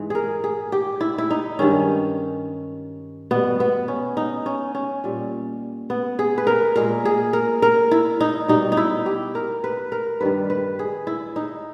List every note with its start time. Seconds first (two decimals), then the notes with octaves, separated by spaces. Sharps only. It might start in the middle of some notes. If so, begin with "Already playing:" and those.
Already playing: G#2 E3 G#3
0.10 G#4 A#4
0.44 G#4
0.72 G4
1.01 E4
1.18 E4
1.30 D#4
1.59 G2 D#3 G#3 C#4
3.31 B2 G3 B3
3.60 B3
3.88 C#4
4.17 D#4
4.46 C#4
4.75 C#4
5.04 A#2 G3
5.90 B3
6.19 G#4
6.38 B4
6.47 A#4
6.76 A#2 G#3 A#4
7.05 G#4
7.33 A#4
7.62 A#4
7.91 E4
8.21 D#4
8.48 B2 G3 D#4
8.72 D#4
8.77 E4
9.06 G4
9.35 A#4
9.64 B4
9.92 A#4
10.21 G2 D#3 G3 B4
10.50 B4
10.79 G#4
11.07 E4
11.36 D#4